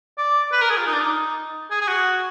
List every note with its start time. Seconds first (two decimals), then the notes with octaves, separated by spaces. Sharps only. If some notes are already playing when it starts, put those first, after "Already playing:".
0.18 D5
0.52 B4
0.61 A#4
0.70 G#4
0.77 F4
0.86 D#4
0.93 D4
1.00 D#4
1.70 G#4
1.81 G#4
1.88 F#4